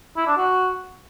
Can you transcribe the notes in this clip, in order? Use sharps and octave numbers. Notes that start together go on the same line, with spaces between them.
E4
D4
F#4